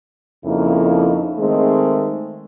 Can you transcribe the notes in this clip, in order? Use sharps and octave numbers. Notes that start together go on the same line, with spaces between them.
F2 C#3 A#3 D#4 E4
D#3 G#3 A3 C4 G#4